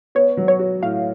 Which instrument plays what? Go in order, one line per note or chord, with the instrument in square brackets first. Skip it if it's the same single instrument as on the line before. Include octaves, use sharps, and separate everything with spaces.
[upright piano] B3 [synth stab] C#5
[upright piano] F#3
[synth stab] C#5
[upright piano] F#4
[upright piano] A2 [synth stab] F5